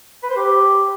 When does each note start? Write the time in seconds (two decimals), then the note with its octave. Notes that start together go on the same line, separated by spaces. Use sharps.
0.23 B4
0.30 C5
0.36 G4